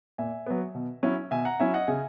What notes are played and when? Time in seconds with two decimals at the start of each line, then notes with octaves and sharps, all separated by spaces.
0.18 A#2 E5 G#5
0.46 F#3 B3
0.75 B2
1.03 F#3 C#4 E4
1.31 B2 E5 G#5
1.45 F#5 A#5
1.60 F#3 C#4 E4 E5 G#5
1.74 D#5 F#5
1.88 C#3 E5 G#5